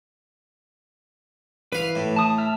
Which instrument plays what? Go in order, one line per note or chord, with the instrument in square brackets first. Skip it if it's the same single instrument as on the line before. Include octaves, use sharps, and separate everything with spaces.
[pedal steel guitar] E3 B4 [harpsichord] F5 B5
[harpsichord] A2
[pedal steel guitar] A5 D#6
E5 A5 F6